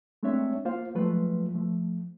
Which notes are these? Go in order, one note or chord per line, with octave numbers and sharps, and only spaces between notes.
G#3 A3 C4 D4 C#5 E5
A#3 F4 C5 F5
F3 F#3 G#3 A3 F4 B4
F3 A3